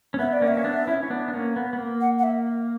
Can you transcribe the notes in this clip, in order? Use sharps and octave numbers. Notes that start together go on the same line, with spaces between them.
C#4
B3 E5
D5
A#3 C#4
E5
C#4
B3 D4
C#4 E4
C#4
B3 D4
D4
A#3 C#4
B3
B3
A#3
F#5
F#5
E5